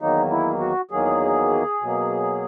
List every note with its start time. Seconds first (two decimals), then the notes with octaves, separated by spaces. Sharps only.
0.01 E2 D#3 F#3 A#3 D#4
0.31 E4
0.60 F#4
0.91 E2 D#3 F#3 A#3 G#4
1.81 B2 F#3 A#3